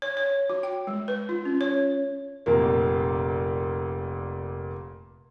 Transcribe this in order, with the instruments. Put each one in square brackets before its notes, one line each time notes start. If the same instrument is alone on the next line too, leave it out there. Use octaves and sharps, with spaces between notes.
[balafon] C#5
C#5
F#4
G5
G#3
B4
F4
C#4
C#5
[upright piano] F1 A#2 A#3